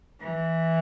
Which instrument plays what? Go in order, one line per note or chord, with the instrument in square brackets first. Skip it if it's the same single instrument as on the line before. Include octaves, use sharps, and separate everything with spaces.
[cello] E3